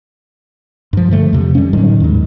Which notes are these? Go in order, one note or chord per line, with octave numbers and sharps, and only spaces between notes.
G2 F3
D3 F3 A3
F2 C3
G3 C#4
A2 D3 D#3 F#3
D#2 G#2